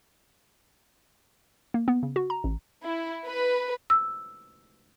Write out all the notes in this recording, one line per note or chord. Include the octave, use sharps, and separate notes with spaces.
A#3
B3
C#3
F#4
A#5
A1
E4
B4
E6